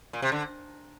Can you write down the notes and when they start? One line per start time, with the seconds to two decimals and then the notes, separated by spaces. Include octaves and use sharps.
0.13 A#2
0.22 C3
0.32 D3